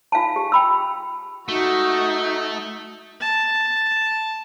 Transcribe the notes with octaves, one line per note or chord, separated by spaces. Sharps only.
F4 F5 G#5 A5
G4
G5 B5 E6
A3 D#4 F#4
A5